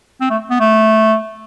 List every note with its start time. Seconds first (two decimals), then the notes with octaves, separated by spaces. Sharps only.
0.21 C4
0.30 A3
0.50 B3
0.60 A3